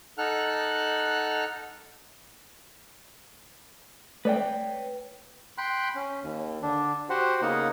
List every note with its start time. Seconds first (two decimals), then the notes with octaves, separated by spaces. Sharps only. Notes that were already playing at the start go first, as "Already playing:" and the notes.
0.18 D#4 A4 F#5 F6 F#6
4.25 A3 B4 C#5 D5 G5
5.58 G5 B5 C6 F#6
5.95 C#4
6.23 D#2
6.62 D3 D4
7.10 F#4 G4 C5 F#5
7.42 C#3 A#3 B3 D#4 F#5